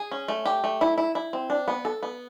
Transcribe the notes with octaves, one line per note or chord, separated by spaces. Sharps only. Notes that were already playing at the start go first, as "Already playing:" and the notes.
Already playing: G#4
C#4
A3
G4
A3
E4
E4
E4
C4
D4
B3
A4
B3